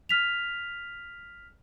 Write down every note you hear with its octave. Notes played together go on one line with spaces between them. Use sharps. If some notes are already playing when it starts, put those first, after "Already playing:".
F6 B6 F7